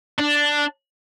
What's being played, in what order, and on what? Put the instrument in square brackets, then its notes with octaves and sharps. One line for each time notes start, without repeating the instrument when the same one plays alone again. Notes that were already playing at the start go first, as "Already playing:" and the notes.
[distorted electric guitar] D4